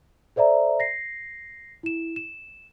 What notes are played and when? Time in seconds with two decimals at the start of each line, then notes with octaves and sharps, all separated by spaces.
0.36 A4 C5 D5 E5 A#5
0.80 A#6 C7
1.83 E4 E7
2.16 E7